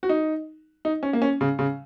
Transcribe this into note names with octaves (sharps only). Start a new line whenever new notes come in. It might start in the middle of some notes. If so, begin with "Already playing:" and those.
F#4
D#4
D#4
C#4
A#3
C#4
C#3
C#3